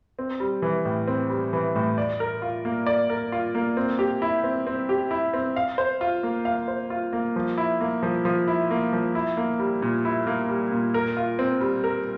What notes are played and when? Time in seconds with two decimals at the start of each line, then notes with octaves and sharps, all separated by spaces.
0.19 C4
0.40 G3
0.62 E3
0.85 A2
1.08 C4
1.30 G3
1.53 E3
1.75 A2
1.98 D5
2.20 A#4
2.42 F4
2.65 A#3
2.86 D5
3.10 A#4
3.32 F4
3.55 A#3
3.77 C4
3.99 G4
4.22 E4
4.44 C4
4.67 C4
4.89 G4
5.11 E4
5.34 C4
5.56 F5
5.78 C5
6.01 F4
6.23 A#3
6.45 F5
6.68 C5
6.90 F4
7.13 A#3
7.36 F3
7.58 E4
7.81 A#3
8.03 F3
8.25 F3
8.48 E4
8.70 A#3
8.93 F3
9.15 E4
9.37 A#3
9.60 G3
9.82 A#2
10.05 E4
10.27 A#3
10.49 G3
10.71 A#2
10.94 A#4
11.17 F4
11.39 C4
11.61 G3
11.84 A#4